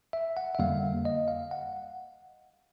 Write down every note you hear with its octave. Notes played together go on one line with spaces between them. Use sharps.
E5
F#5
E5
F2 D3 G3 A#3 F5
D#5
F5
F#5